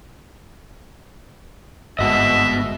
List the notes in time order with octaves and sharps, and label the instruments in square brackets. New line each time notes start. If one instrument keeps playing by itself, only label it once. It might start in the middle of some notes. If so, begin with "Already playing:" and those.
[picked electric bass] G1 G#2 [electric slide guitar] B3 F#4 D#5 [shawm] E5